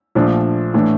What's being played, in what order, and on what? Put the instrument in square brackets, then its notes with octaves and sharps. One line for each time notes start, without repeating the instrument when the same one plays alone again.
[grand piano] A#1 A#2 F3 A3 D4
A2 E3 A3 D4